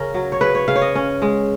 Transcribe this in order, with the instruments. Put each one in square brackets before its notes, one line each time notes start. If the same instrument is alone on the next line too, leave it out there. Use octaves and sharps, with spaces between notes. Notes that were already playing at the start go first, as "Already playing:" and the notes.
Already playing: [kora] C#3 C#4 A#4
F#3
C#5
C#3 B4
C#5
C#3 F5
C#5
D#5
C#4
G#3